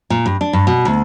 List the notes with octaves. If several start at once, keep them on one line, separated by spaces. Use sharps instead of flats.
A#2
G2
D4
G2
B2
D2